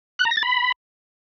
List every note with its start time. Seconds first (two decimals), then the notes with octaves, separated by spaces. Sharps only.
0.19 F#6
0.25 A#5
0.31 A#6
0.37 A6
0.43 B5